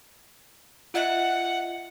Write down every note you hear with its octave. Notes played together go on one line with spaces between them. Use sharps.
F4 D#5 E5 F#5